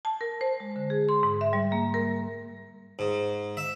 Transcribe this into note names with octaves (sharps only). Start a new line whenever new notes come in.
A5
A#4
C5
G#3
D3
G#4
C6
G#2
E5
G3
A#3
A#4
G#2
E5